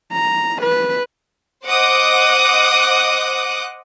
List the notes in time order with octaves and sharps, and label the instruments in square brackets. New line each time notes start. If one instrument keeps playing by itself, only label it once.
[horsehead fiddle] A#5
B4
[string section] C5 D#5 F#5 D6 D#6 F#6